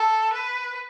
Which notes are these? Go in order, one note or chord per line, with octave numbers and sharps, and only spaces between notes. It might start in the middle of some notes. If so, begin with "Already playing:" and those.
Already playing: A4
B4